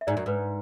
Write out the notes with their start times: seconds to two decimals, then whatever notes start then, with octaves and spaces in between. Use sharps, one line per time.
0.01 E5
0.07 G#2 D5
0.17 F#2
0.26 G#2 B4